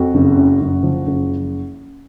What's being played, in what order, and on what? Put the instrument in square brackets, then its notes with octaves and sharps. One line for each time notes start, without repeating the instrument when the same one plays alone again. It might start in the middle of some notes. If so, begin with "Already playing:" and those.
Already playing: [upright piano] F2 F#4
F#1
F#2
F#1
F3
F#1